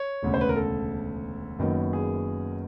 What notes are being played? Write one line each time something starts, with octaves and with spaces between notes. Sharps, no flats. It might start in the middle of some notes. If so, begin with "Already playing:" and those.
Already playing: C#5
E1 D2 C#3
C5
B4
A#4
A4
F#1 F#2 D#3 F#3 B3
G#4